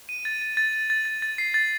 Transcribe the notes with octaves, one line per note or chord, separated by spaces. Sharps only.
D#7
A6
A6
A6
A6
A6
A6
A6
C7
A6